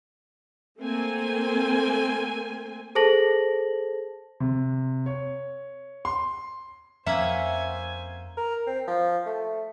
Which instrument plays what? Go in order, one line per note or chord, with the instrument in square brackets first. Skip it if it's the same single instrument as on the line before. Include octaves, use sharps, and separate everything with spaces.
[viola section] A3 A#3 C4 G#5
[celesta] G#4 A4 C5 A5 A#6 F#7
[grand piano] C3
C#5
C6
[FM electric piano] F2 [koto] A#3 C#4 F#5 [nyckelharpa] C5 G#5 [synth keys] E5 G#6
[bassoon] A#4
C4
F3
A3